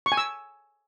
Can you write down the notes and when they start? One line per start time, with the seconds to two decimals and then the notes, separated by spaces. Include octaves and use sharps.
0.06 C#6
0.12 G#5
0.17 E6